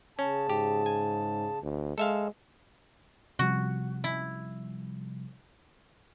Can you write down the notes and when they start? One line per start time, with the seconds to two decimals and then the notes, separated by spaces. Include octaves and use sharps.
0.19 C#3 C#4 A5
0.50 G#2 G4
0.86 G#5
1.62 D2
1.98 G#3 A4 E5 F5
3.39 C3 F3 G3 F#4
4.04 E4